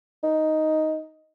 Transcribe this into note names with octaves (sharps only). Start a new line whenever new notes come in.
D#4